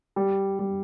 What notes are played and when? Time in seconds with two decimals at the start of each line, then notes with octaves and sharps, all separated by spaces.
0.16 G3
0.59 G3